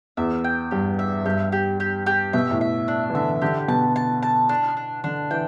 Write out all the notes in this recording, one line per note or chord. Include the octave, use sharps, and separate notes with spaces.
E2 E5
G5
G2 G4
E5
G2 G4
G4
G4
G4
B2 E5
A2
E5
D4
E3
D3 E5
D3 G4
B2 A5
A5
A5
D4
D4
D3 D4
E3 G5